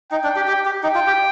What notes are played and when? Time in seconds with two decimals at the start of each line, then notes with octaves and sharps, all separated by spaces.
0.11 D#4 G5
0.24 D4
0.36 G4
0.47 G4
0.65 G4
0.83 D#4 G5
0.95 F4
1.07 G4